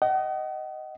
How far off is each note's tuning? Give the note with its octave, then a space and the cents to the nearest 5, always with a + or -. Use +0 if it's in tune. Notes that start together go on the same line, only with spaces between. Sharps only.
D#5 +0 F#5 +40